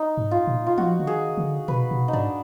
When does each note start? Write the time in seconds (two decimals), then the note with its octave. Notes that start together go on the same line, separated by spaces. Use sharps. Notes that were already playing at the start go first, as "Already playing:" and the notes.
Already playing: D#4
0.17 G#2
0.31 F4
0.47 A#2
0.66 F4
0.78 F3 F#4
1.00 D3
1.07 D#3 G#4
1.37 D3
1.68 B2 B4
1.91 B2
2.08 D#4
2.13 G#2 D4